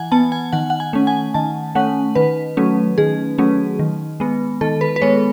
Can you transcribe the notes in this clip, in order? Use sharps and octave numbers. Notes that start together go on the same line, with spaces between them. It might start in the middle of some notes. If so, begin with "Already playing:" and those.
Already playing: E3 F#5 G#5
B3 A5
G#5
D#3 F#5
F#5
G#5
A3 C#4
G#5
D#3 A5
A3 C#4 F#5
D#3 B4
F#3 A3 C#4
D#3 G#4
F#3 A3 C#4
D#3
G#3 B3
D#3 A4
B4
B4
G#3 B3 C#5